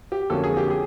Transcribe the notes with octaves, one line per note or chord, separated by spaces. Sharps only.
G4
F2 D3 F#3 A#3 C#4 A4
G#4
G4
G#4